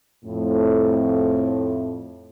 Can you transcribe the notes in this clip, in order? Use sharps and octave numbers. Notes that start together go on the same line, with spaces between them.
F2 A2